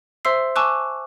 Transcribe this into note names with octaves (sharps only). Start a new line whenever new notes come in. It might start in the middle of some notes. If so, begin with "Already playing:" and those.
C5 E5 C6 E6 C7
G#5 A5 C#6 D6 E6 F#6